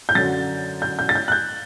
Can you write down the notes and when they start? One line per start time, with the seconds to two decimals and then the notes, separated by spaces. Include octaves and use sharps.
0.09 G6
0.15 F#2 D3 F#3 A6
0.82 G6
0.99 G6
1.09 A6
1.15 G6
1.28 F#6
1.32 G6